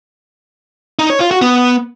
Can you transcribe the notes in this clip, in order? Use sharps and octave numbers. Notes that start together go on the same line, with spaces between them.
D#4
C#5
F4
F#4
B3